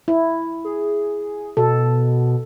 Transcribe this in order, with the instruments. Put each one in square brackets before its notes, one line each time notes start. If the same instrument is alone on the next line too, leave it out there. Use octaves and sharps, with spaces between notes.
[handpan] E4
[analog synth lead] G#4
[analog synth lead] B2 [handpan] A4